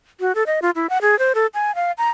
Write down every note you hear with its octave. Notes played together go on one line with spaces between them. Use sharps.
F#4
A4
D#5
F4
E4
F#5
G#4
C5
A4
G#5
F5
A#5